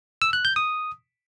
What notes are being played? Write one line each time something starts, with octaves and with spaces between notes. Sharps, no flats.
E6
F#6
G6
D#6